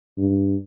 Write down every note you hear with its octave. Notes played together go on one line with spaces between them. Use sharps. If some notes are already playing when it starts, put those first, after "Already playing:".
G2